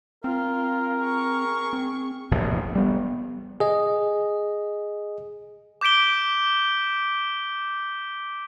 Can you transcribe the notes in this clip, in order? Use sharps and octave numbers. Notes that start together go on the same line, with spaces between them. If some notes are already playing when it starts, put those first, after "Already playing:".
C4 F4 A#4
G#4 C#6
C4
E1 A#1 A2 C3
G3 B3
G#4 D#5
D6 G6 B6 D7 G7